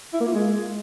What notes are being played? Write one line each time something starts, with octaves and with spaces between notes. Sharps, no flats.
E4
A#3
F4
G#3